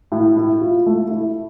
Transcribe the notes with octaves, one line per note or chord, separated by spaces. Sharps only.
A2
E4
F4
A3
E4